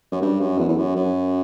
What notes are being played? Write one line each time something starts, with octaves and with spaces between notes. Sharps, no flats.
F#2
G2
F#2
E2
E2
F#2
F#2